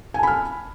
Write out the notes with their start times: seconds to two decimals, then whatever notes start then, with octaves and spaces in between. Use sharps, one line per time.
0.14 G#5
0.19 A5
0.23 B5
0.27 F6